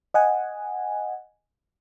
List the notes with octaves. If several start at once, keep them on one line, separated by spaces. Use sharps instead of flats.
D#5 F#5 G#5